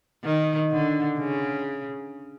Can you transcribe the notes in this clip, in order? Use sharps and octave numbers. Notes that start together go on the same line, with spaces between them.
D#3
D3
C#3